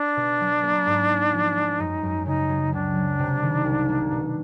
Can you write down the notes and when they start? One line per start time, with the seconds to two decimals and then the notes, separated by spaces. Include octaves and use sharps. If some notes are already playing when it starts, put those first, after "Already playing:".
Already playing: D4
0.16 B2
0.40 F#3
0.63 A#3
0.87 G#2
1.10 C#4
1.33 F3
1.56 G#3
1.79 F#2 D#4
2.03 F#2
2.26 C#3 D#4
2.49 F#3
2.73 C#2 D4
2.95 F#3
3.19 C3
3.42 D#3
3.65 C2
3.89 A#3
4.11 B2